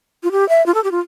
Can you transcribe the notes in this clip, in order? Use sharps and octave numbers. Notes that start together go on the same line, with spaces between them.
F4
G4
E5
F4
A4
G4
F4